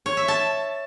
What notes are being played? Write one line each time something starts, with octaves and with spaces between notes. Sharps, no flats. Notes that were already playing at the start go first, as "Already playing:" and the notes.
C#5
E5
A5